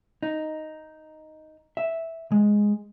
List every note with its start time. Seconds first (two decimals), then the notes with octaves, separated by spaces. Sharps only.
0.23 D#4
1.77 E5
2.32 G#3